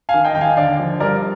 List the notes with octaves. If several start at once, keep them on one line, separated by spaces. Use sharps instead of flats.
F5 G#5
D#3
D#5 G5
D#2 G5
F5 G#5
D3 D5 F5
F3
G2 A#4 D5